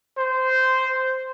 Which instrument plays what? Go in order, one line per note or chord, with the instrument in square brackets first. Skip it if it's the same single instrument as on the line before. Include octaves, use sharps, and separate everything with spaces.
[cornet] C5